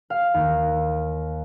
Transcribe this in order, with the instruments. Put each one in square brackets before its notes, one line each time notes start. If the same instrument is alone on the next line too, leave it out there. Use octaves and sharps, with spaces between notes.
[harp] F5
D#2